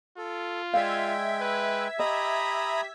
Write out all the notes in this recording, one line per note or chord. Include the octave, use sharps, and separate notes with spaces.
F4 A4
G#3 D5 E5 F5 G5 G#6 B6
B4
G4 D#5 A#5 B5 D#6